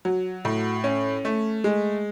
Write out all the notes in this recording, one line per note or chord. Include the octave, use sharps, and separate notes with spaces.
F#3
A2
C#4
A3
G#3